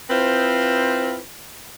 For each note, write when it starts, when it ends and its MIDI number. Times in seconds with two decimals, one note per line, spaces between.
0.10 1.17 60
0.10 1.17 64
0.10 1.17 65
0.10 1.17 71
0.10 1.17 72